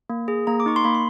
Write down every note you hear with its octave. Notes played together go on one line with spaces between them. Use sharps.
A#3
G#4
A#3 A#5
D6
D#4 C#6
C6
A#3 B5
C6